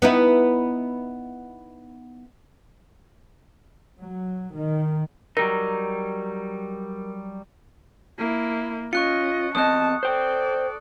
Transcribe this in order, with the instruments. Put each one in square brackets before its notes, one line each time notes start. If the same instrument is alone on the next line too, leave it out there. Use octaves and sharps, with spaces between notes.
[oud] B3 D#4 E4
[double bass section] F#3
D#3
[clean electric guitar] F#3 G3 D#4 [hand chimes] A#4
[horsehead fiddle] A#3 E4
[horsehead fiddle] C#4 D#5 [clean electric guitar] F4 [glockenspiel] C#6 F#6 C#7
[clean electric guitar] E2 C4 D#5 [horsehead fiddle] A5 [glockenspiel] D#6 F#6
[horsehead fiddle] A4 D5 [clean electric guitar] C5 G5